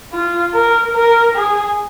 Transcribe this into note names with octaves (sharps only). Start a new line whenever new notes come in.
F4
A#4
A#4
G#4